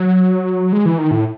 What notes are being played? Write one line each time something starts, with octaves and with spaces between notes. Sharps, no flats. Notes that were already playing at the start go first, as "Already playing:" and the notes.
Already playing: F#3
G#3
E3
D#3
A2